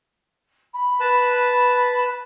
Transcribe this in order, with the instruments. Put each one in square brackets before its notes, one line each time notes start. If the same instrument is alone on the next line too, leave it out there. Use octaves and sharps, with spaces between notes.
[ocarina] B5
[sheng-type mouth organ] B4 A5